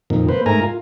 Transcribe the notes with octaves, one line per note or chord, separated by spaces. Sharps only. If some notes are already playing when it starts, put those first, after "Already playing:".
F2 A#2 D#3
A#3 B4 C5
G#2 A3 A#4 G#5 A#5
F4